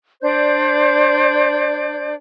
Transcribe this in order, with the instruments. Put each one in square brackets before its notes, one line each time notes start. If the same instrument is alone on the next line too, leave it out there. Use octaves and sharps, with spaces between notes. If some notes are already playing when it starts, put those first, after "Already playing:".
[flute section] D4 C5 D5 G6